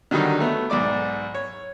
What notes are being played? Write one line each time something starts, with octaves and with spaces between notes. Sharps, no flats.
D3 D#3 F#3 G3 D#4
A3 B3
B1 G#2 D5 D6
C#5